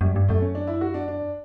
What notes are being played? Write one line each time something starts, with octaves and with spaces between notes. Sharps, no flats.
F#2 G3
G2 G3
F#2 A3
C#4
D4
E4
F#4
D4
D4